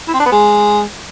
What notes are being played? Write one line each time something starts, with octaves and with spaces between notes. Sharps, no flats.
E4
C4
D4
B3
G#3